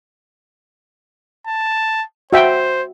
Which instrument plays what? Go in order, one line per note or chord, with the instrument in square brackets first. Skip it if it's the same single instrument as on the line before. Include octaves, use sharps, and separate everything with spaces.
[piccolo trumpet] A5
[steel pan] F#4 E5 G5 [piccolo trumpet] C5